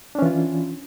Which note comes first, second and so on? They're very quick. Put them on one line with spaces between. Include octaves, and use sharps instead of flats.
D4 C#4 E3 F4